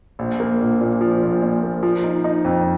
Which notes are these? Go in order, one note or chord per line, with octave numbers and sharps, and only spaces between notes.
A#1
A#3
A#1
A#2
F3
A#1
A#2
A#3
F3
D#4
D#4
F2